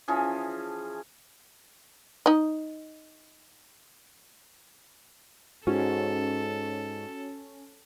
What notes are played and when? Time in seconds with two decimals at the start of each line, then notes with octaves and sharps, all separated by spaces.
0.08 E3 F3 C#4 G#4
2.26 D#4 D#5
5.67 G#2 C#4 F#4 A4